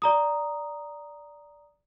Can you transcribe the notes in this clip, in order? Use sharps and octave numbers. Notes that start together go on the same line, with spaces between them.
D5 A#5 D#6